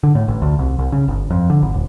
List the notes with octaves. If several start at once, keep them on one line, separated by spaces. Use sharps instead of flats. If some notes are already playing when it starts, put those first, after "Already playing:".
D3
A2
A1
D2
C2
C2
C#3
G1
F2
D3
G#1
D#1